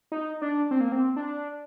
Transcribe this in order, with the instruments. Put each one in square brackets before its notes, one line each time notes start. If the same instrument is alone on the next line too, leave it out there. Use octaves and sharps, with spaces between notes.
[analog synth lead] D#4
D4
C4
A#3
C4
D4